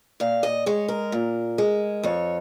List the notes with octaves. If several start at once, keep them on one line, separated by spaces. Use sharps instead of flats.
A#2 F5
D#5
G#3 C#5
A#4
A#2
G#3
F2 C#5